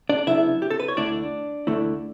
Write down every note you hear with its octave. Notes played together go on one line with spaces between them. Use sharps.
D4 D5
C#3 F#3 B3 D4 E4 E5
G4
A4
B4
C#5
D2 D3 A3 D4 E4 D5
D2 D3 A3 E4